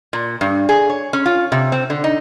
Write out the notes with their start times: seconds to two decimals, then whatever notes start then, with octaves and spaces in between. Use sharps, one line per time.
0.13 A#2
0.41 G2
0.69 G#4
0.90 C#5
1.13 C#4
1.26 F4
1.52 C3
1.72 C4
1.90 D3
2.04 D#4